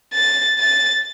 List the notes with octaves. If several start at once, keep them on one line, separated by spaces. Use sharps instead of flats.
A6
A6